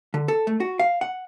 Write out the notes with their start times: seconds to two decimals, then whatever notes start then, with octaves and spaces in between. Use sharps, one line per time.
0.14 D3
0.28 A4
0.47 A3
0.60 F#4
0.79 F5
1.01 F#5